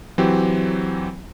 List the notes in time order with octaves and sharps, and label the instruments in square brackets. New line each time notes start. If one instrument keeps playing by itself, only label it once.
[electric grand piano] E3 F#3 C4 G4